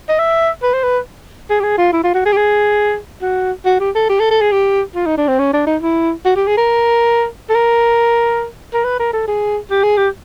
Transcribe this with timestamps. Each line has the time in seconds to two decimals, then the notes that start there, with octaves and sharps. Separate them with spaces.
0.09 D#5
0.19 E5
0.63 B4
0.74 C5
0.83 B4
1.50 G#4
1.60 G4
1.63 G#4
1.78 F4
1.93 E4
2.04 F4
2.14 F#4
2.26 G#4
2.32 G4
2.36 G#4
3.22 F#4
3.65 F#4
3.80 G4
3.95 A4
4.09 G4
4.20 A4
4.31 A4
4.41 G#4
4.51 G4
4.95 F4
5.06 D#4
5.17 D4
5.28 C4
5.39 C#4
5.53 D4
5.67 D#4
5.82 E4
6.25 F#4
6.36 G4
6.47 G#4
6.57 A#4
7.49 A4
7.55 A#4
8.74 A#4
8.84 B4
8.99 A#4
9.13 A4
9.28 G#4
9.70 G4
9.83 G#4
9.97 G4